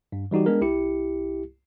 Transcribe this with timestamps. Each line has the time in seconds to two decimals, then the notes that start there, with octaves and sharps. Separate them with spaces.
0.12 G2
0.31 E3 G3 D#4 F#4 G4
0.46 G#3 B3 D4 G#4 A#4
0.61 C2 E4 G4 C#7